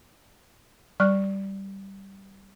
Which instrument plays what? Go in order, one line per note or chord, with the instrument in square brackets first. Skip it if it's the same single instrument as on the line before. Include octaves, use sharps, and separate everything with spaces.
[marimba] G3 D5 C#6 F6 F#6